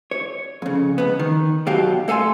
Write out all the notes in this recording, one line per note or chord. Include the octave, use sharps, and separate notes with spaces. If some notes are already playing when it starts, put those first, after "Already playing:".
C#5
F2 C#3
C#2 B3
D#3
B1 B2 F#3 G4 F5
A3 A4 F5 G#5 C6